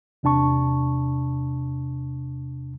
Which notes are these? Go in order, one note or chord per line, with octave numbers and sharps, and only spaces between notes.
E2 C3 D4 A5 C#6